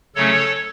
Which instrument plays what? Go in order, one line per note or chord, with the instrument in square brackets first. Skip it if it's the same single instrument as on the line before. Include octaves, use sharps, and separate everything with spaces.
[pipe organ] C#3 F#3 A3 C#4 A4 C#5